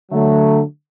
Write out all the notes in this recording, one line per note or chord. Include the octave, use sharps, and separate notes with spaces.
D3 F#3 A3